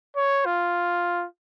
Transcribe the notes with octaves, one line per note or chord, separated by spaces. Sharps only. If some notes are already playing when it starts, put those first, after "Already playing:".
C#5
F4